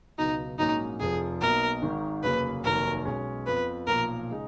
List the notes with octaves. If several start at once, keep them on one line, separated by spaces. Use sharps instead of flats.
C#2 B2 F#3 D#4
A#1 G#2 F#3 A#3 C#4 D#4
F1 F2 F3 G#4
B1 B2 A#3 D#4 A#4
G#1 G#2 D#3
F1 D#2 C#3 F#3 A#3 B4
F1 D#2 D#3 F#3 A#4
B1 B2 G#3 C#4
F2 F3 B3 B4
B1 A#2 F3 A#4
C#3 G#3 D#4